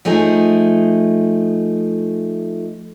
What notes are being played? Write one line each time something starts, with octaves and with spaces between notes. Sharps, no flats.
F3 A3 D#4 G#4